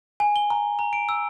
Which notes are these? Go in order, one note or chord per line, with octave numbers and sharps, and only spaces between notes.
G#5
G7
A#5
A#5
D7
E6